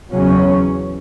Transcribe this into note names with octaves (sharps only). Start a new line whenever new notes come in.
E2 C#3 F#3 C#4